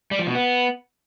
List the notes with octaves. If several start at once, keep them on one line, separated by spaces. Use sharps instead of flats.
G3
F3
B2
B3